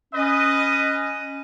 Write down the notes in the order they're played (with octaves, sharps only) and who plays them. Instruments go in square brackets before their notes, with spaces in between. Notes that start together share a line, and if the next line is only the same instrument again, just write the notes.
[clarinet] C#4 [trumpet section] B4 D#5